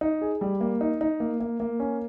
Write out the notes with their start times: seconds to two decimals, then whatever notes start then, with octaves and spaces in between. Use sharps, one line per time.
0.01 D#4
0.21 G#4
0.41 G3
0.61 A#3
0.81 D#4
1.01 D#4
1.20 A#3
1.40 A#3
1.60 A#3
1.80 C#4